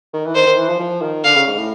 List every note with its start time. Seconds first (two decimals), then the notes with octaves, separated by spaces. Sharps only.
0.14 D#3
0.26 E3
0.35 D#3 C5
0.46 D#3
0.58 E3
0.69 F3
0.80 F3
1.02 D#3
1.24 D3 F5
1.35 C#3
1.47 G#2
1.58 A2